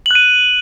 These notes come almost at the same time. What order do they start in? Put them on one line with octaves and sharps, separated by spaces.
F#7 F#6 D#7